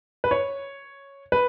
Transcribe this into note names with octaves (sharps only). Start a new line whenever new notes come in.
B4
C#5
B4